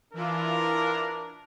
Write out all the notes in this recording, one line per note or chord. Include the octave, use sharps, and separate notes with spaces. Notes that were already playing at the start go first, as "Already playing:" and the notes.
E3 D4 E4 F4 A#4